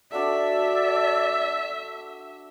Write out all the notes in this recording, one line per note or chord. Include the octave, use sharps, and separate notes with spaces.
D4 F#4 A4 D5 E5